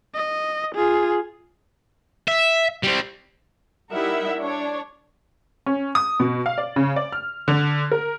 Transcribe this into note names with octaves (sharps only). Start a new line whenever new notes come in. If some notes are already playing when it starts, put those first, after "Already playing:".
D#5
F4 G#4
E5
G3 C4
G3 D#4 E4 A#4 E5 F#5
D4 C#5
C#4
D#6
B2
F5
D5
C#3
D5
F6
D3
A#4